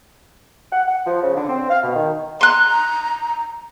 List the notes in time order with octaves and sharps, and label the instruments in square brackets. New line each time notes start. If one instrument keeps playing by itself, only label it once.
[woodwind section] F#5
F#5
F3
C#3
D3
C4
F5
B2
D#3
[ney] A#5 [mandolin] C6 F#6